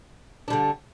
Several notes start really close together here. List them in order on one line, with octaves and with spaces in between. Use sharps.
D4 G3 D3